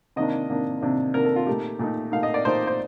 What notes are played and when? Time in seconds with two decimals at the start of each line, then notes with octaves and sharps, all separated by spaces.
0.16 C3 D#3 A#3 D4 D#5
0.49 C3 D#3 A#3 D4
0.81 C3 D#3 A#3 D4
1.14 C3 D#3 A#3 D4 A#4
1.25 A4
1.36 F4
1.47 A#2 A3 D#4 G4
1.79 A#2 A3 D#4
2.12 A#2 A3 D#4 F5
2.23 D#5
2.34 D5
2.45 A#2 A3 D#4 C5
2.67 C5